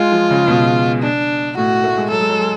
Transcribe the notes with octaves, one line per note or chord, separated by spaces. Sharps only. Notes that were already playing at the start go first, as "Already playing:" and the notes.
Already playing: G#3 F4
F3
C#3
B2
D4
A2 F#4
A3
G#3
F#3 A4
G#3
F#3
G#3